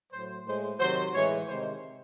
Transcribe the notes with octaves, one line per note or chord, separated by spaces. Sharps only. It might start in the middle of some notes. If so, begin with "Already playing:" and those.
A2 F#3 C5
A2 G#3 C5
C3 D#3 F#3 C5
A2 E3 G#3 C#5
C3 D#3 G#3 C5